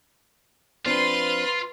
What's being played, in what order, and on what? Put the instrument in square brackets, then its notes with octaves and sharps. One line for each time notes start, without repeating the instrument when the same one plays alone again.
[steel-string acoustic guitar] F3 C4 D4 [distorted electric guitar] F4 [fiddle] B4 C6